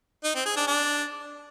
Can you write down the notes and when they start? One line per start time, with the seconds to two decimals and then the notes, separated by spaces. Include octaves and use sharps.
0.24 D#4
0.35 C4
0.46 G#4
0.56 D4
0.67 D4